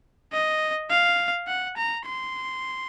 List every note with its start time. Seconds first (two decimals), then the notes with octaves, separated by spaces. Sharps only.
0.32 D#5
0.90 F5
1.47 F#5
1.77 A#5
2.06 C6